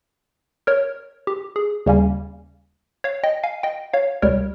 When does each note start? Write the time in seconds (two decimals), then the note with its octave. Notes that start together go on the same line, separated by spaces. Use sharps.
0.67 A#4 C#5
1.27 G4
1.56 G#4
1.86 D#2 C#3 G3 A#3 C#4
3.04 C#5 F5
3.24 D#5 G5
3.43 F5 G#5
3.63 D#5 G5
3.93 C#5 F5
4.22 C#2 C3 G3 A#4 C#5